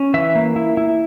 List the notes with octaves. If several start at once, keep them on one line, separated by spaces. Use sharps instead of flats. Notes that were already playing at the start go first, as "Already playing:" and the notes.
Already playing: C#4
E3 E5
A#3
E4
E4